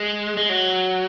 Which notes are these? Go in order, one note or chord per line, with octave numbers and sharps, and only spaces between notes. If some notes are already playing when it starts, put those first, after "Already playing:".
Already playing: G#3
G#3
F#3